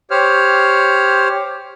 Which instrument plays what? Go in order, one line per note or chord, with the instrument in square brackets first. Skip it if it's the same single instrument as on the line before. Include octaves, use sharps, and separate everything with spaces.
[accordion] G4 C5 C#5 F6